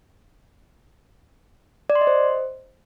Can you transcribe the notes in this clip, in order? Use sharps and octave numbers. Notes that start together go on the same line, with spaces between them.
D5
C6
D#5
C5